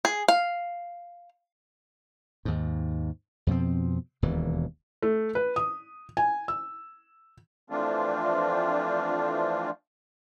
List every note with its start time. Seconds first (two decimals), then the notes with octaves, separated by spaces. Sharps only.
0.05 G#4
0.28 F5
2.45 D#2 G#2
3.47 F2 B2 F3 C4
4.22 E1 D#2 B2 E3
5.03 A3
5.35 B4
5.56 D#6
6.17 G#5
6.48 E6
7.70 E3 F3 A3 C4 D4 F4